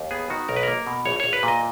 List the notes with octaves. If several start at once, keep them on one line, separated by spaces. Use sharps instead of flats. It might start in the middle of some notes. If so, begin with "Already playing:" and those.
Already playing: D#2
B3 G#4
D#3 F#4
B1 A#4
B4
A#3 A#4
B2
A#1 C#5
A#1 C#5
B4
A#2
D#5